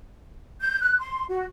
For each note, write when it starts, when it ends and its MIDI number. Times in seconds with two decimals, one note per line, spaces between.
0.60 0.79 91
0.81 0.96 90
0.99 1.24 84
1.29 1.44 66